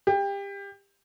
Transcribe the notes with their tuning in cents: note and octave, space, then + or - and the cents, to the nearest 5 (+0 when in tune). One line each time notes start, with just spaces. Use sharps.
G4 +25